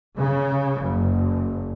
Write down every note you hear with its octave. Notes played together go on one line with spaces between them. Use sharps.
C#3
F#1